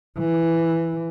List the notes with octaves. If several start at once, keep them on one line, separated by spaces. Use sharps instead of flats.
E3